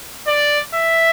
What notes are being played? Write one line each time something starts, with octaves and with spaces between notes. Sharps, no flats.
D5
E5